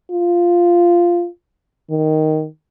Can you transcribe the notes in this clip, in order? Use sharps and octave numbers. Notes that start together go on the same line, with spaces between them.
F4
D#3